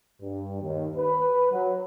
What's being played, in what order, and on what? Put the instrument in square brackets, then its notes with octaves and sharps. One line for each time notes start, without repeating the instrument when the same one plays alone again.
[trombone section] G2
D#2
B4
F#3